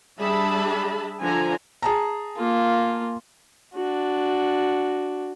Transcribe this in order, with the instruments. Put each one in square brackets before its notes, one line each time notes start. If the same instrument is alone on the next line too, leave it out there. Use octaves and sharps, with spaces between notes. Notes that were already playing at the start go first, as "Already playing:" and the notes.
[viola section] G3 D4 G#4 E5 A5 B5
D3 F3 G#5 A#5
[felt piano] G#4 A5 A#5
[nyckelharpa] A#3 F4
D4 F#4